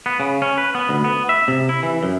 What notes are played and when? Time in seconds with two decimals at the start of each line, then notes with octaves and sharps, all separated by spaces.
0.06 B3
0.20 C#3
0.42 C#4
0.58 B4
0.75 B3
0.89 D2
1.04 B3
1.29 E5
1.48 C3
1.69 E4
1.83 E3
2.03 F#2